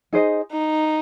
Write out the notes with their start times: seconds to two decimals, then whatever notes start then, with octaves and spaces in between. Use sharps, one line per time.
0.13 D#4 G#4 C5 D#5
0.52 D#4